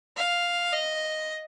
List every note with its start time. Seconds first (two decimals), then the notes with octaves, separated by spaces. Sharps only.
0.17 F5
0.73 D#5